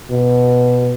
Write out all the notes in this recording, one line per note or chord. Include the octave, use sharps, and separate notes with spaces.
B2